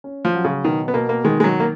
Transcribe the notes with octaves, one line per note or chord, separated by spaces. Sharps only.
C#4
F3
F#3
C#3
B2 D#3
B3
B2 A#3
A#3
D#3 G#3
G#3
F#3
A#3